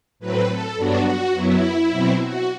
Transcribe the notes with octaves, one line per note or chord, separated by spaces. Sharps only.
A2 F#3 C4 B4
A4
G2 F#3 B3 D4 F#4
F#4
F#2 F#3 B3 E4
B2 F#3 C4
F#4